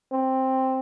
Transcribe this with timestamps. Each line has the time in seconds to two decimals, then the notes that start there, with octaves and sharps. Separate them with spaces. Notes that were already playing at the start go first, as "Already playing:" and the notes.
0.12 C4